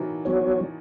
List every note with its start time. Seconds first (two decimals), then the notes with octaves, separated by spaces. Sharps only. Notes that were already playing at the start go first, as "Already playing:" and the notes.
Already playing: B2 D#3 E3 F#3
0.25 F#3 B3 F#4 C#5